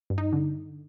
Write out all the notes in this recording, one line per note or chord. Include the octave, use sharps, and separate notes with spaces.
G2
D#4
D3